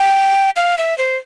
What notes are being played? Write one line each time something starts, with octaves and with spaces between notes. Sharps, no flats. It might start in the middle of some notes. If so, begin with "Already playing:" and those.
Already playing: G5
F5
E5
C5